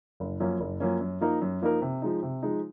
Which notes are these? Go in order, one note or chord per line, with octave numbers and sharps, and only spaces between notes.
F#1
F#2 F3 A#3 C#4
F#1
F#2 F3 A#3 C#4
F#2
F3 A#3 D#4 A#4
F#2
F3 A#3 D#4 A#4
C3
F3 G#3 D#4
C3
F3 G#3 D#4